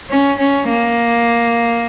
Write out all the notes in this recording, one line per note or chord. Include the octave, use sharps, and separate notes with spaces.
C#4
C#4
A#3